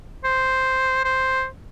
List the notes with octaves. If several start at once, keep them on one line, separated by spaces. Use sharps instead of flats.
C5
C5